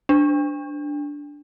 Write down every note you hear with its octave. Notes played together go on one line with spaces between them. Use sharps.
D4